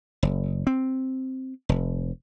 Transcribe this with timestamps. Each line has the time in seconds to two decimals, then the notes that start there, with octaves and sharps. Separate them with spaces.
0.23 F#1
0.67 C4
1.69 F1